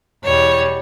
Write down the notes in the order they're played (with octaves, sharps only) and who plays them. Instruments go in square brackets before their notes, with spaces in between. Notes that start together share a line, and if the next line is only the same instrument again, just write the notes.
[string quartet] E2 B2 G3 C#5